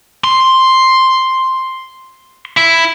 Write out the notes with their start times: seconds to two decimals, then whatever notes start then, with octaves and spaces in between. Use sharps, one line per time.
0.24 C6
2.57 E4